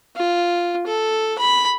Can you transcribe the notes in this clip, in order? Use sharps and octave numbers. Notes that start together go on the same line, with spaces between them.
F4
A4
B5